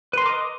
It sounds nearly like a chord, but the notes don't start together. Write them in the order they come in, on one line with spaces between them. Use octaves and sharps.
B4 C6 A#4 D6 D#5